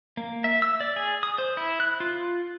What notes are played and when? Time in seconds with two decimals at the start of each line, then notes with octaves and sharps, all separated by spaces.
0.17 A#3
0.44 E5
0.62 E6
0.80 D5
0.96 G#4
1.23 D#6
1.38 C5
1.57 E4
1.80 F#6
2.00 F4